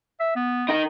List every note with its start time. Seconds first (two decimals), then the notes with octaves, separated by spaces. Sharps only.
0.20 E5
0.36 B3
0.69 D#4 A#4